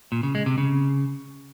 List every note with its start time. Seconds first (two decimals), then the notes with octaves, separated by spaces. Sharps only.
0.12 A#2
0.23 C#3
0.35 G#3
0.46 C3
0.58 C#3